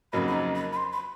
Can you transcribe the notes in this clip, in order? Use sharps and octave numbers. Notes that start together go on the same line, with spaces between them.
F2 C#3 F#3 A#3 D#4 B5
B5
A#5
B5
B5
C6
B5